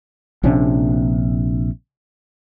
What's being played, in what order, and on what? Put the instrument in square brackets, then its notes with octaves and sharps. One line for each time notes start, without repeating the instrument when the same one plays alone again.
[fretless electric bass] A#1 C3 C#4 D4